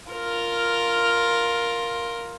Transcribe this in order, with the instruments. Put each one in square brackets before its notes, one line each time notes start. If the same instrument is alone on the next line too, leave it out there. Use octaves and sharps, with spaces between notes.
[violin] F4 A#4